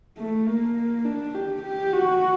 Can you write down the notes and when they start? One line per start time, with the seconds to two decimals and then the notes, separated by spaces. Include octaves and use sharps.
0.18 A3
0.46 A#3
1.05 D4
1.34 G4
1.62 G4
1.92 F#4